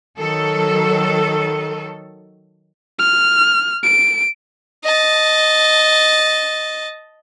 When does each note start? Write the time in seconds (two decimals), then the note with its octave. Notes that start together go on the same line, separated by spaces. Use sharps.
0.18 D#3 F#3 A4
2.99 F6
3.83 D7
4.84 D#5 A5